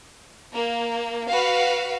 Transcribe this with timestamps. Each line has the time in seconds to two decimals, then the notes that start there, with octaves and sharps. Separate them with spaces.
0.52 A#3
1.28 F#4 B4 F5